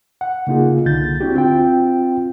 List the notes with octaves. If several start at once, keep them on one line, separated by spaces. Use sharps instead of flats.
F#5
C#3 A#3 D#4 F4 G#4
C2 D3 G6 A6
C4 D4 E4 F#4 G4
C4 F4 G5